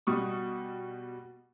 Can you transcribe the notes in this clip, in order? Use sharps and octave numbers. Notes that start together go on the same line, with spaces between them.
B2 G3 C#6 D#6